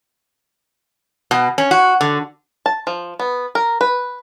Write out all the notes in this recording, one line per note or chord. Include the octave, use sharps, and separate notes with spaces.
B2
C#4
F#4
D3
A5
F3
B3
A#4
B4